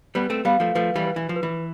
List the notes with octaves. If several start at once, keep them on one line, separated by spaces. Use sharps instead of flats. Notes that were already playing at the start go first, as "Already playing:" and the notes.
G3 B3 B4
A3 C4
G3 B3 F5
F3 A3
F3 A3 B4
E3 G3
B4
E3
F3
B4
E3